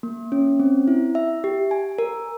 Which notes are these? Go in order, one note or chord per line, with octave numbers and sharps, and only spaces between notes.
A#3
C#4
C4
E4
E5
G4
G#5
A#4